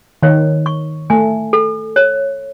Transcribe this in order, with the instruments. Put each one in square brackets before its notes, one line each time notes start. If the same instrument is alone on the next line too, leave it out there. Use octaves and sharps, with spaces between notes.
[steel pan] D#3 [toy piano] C#5
[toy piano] C#6
[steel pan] A3 [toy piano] G#5
[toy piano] A4
C#5